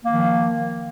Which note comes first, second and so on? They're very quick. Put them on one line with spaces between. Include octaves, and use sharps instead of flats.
A#3 D#3 F3